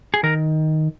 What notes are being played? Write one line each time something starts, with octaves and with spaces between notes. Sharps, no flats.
G#4
D#3 A#4